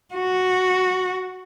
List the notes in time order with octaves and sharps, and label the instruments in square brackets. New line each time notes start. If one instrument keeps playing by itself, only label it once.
[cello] F#4